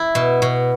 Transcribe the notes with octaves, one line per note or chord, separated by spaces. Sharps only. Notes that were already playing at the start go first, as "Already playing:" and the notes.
Already playing: E4
B2
B2